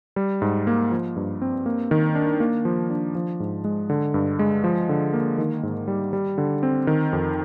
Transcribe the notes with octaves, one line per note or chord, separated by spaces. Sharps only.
G3
G#2
A#3
F3
G2
C4
A#3
D#3
D4
A#3
F3
D4
F3
G#2
G#3
D3
G2
G#3
F3
D3
A#3
D#3
G#2
G3
G3
D3
C4
D#3
F2